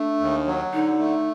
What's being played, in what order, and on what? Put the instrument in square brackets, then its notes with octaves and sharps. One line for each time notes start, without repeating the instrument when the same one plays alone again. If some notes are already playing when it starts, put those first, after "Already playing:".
Already playing: [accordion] A3 [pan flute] D4
[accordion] D#2
F#3
[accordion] D3 [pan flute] D#4
[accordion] A3